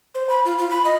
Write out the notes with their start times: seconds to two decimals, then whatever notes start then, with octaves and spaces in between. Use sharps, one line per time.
0.15 C5
0.29 B5
0.45 F4
0.58 F4
0.71 B5
0.85 D#5